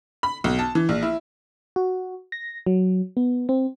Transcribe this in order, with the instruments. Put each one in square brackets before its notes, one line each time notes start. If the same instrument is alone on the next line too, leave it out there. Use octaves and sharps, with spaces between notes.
[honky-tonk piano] B5
B1
A5
E3
A#1
E4
[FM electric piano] F#4
A#6
F#3
B3
C4